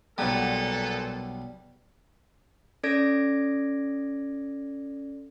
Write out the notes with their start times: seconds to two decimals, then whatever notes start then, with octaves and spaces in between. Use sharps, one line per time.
0.18 B1 A#2 G3 B3 A4
2.83 C#4 A4 D5 G#6 A#6 D7